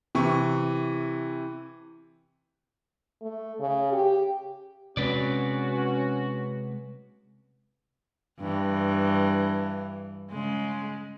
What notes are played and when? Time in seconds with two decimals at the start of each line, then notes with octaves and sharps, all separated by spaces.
0.15 C3 E3 C#6
3.22 A3
3.60 C#3
3.93 G4
4.97 C3 G#3 C4 C#4 F#4 B4 D5
8.39 G2 E3
10.31 C#3 G#3